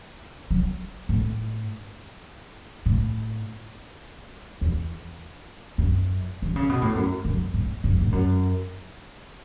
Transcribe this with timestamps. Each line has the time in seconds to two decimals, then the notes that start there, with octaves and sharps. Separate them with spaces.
0.51 F#3
1.09 A2
2.86 A2
4.61 E2
5.78 F#2
6.42 E3
6.56 C#3
6.69 B2
6.82 A2
6.96 F#2
7.25 F#2
7.54 A2
7.84 F#2
8.01 A2
8.12 F#2